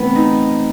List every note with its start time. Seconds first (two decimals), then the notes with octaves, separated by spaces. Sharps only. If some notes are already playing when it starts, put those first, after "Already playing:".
Already playing: E3 A3 B3 C4
0.16 D#4